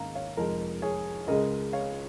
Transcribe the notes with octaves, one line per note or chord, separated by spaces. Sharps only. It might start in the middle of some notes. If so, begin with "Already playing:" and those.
Already playing: G#1 G#2 D#3 A#3 C#4 F5 A#5
C#5 F5
F1 F2 F3 G#3 A#4
G#4 C#5
C#2 C#3 G#3 A#4 D#5
C#5 F5